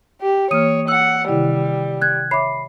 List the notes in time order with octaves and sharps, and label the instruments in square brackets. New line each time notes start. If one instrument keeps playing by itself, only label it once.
[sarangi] G4
[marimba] E3 A#3 F6 [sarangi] C#5 [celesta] D#6 D#7
[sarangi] F#5 [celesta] E6
[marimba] C3 D#3 E4 [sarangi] G3
[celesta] F#6 G#6
[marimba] C#5 E5 D6 [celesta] B5 C7